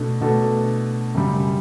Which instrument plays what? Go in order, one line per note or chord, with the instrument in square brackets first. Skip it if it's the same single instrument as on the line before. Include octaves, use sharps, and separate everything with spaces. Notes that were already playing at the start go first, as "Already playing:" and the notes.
Already playing: [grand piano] B2 A3 D4 A4
B2 A3 D4 A4
F#2 C#3 G3